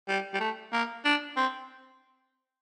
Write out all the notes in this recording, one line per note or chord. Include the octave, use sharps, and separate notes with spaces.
G3
G3
A3
A#3
D4
C4